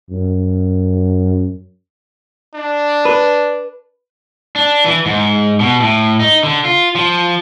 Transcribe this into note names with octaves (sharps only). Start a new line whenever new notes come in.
F#2
D4
B4
D4
E3
G#2
B2
A2
D#4
D3
F4
F3